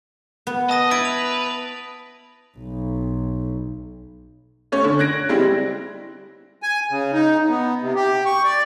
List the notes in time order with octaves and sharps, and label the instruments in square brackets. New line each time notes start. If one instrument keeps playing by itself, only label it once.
[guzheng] B3
[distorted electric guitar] D#5 [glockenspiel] A5 D#6 A#6
[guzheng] E4 [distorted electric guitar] B4 [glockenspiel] A6 A#6 D7
[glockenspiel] F7
[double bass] B1
[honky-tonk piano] A3 C#4 C#5
D3
F#6 G#6 A#6 D7
G3 G#3 C4 E4
[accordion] G#5
C#3
D#4
B3
C3
G4
C#6
D5